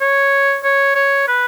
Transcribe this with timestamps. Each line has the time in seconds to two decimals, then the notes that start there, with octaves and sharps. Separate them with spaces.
0.01 C#5
0.64 C#5
0.95 C#5
1.28 B4